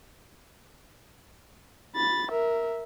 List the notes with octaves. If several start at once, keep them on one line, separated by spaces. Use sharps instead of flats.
B5 A6
A#4 E5